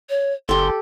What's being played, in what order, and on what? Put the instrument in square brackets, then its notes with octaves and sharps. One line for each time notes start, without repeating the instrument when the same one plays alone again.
[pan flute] C#5
[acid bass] F#1 [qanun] G4 A4 [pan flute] C6